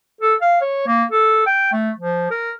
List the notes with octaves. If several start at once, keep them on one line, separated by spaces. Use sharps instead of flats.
A4
F5
C#5
A#3
A4
G5
A3
F3
A#4